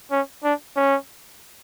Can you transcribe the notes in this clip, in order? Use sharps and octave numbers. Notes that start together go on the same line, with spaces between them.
C#4
D4
C#4